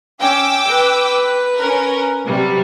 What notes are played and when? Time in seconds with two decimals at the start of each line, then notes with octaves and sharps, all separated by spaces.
0.21 C#4 G5 D6 E6
0.68 B4
1.58 C#4 A#4
2.25 C3 F#3 G3